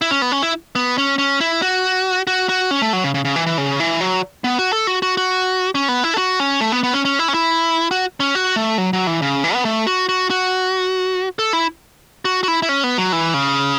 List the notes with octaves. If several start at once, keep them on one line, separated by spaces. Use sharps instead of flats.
E4
C#4
B3
C#4
E4
B3
C#4
C#4
E4
F#4
F#4
F#4
C#4
A3
F#3
C#3
C#3
C#3
E3
E3
C#3
E3
F#3
B3
F#4
A4
F#4
F#4
F#4
C#4
B3
E4
A4
F#4
C#4
A3
B3
B3
C#4
C#4
E4
C#4
E4
F#4
C#4
F#4
A3
F#3
F#3
E3
C#3
E3
B3
A3
F#4
F#4
F#4
A4
E4
F#4
F#4
E4
E4
C#4
B3
F#3
E3
C#3